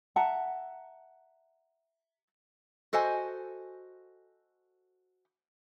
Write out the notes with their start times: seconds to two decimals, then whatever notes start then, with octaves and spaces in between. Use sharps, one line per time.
0.16 E5 F#5 A5 A#5
2.93 F#4 A4 C5 D#5 G#5